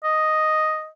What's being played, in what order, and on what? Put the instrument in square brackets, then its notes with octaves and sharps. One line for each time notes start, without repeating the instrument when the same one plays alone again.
[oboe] D#5